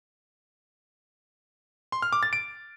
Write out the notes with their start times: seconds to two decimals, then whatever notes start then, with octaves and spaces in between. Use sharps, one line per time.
1.92 C6
2.02 F6
2.13 D6
2.23 A6
2.33 D7